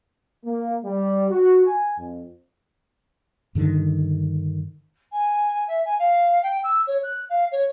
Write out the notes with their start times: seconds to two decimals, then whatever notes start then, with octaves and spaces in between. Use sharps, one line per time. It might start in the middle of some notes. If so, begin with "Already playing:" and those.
0.45 A#3
0.84 G3
1.30 F#4
1.65 G#5
1.98 F2
3.55 G2 D3 D#3
5.12 G#5
5.68 E5
5.85 G#5
5.99 F5
6.43 G5
6.64 E6
6.87 C#5
7.03 F#6
7.30 F5
7.52 C#5